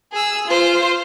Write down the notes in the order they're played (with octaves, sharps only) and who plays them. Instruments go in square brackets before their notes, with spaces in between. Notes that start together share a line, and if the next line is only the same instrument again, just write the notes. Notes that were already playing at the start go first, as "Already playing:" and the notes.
[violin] G#4 E6
F4 C5